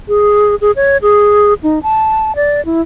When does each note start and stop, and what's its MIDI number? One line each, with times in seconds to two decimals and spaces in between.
0.08 0.55 68
0.61 0.71 68
0.76 0.97 73
1.02 1.54 68
1.63 1.79 63
1.83 2.35 81
2.36 2.64 74
2.65 2.81 64